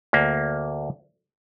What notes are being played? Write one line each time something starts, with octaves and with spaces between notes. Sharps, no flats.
D2 A#3